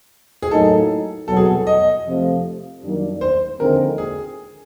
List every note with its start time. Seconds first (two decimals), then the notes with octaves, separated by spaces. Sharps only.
0.42 G#4
0.51 A2 F#3 A#3 D#4 A4
1.28 C2 B2 F#3 A4
1.36 G#4
1.45 A4
1.67 D#5
2.05 F2 C3 F3 A3
2.83 F#2 D#3 G3 A#3 D4
3.21 C5
3.59 D#2 D3 F3 G#3 C4 A#4
3.98 G#4